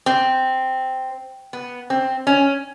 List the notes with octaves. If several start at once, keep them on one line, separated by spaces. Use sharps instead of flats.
C4
B3
C4
C#4